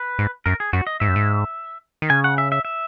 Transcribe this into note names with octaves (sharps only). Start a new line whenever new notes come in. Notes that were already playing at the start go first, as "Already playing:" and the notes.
Already playing: B4
G#2
F#2 A#4
G#4
F#2 F#4
D#5
G#2 E5
F#2
G#2
D#3
C#3 G#5
F#5
E5
E5
E5